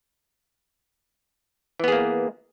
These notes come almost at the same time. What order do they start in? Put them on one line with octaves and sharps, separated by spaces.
E3 B3 G#4 A#3